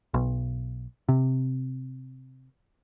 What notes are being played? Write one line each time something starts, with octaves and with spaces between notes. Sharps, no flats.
B1
C3